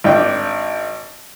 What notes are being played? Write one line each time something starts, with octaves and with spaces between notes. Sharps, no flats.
G#1 D4 G5